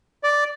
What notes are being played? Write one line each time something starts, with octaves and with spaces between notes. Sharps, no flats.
D5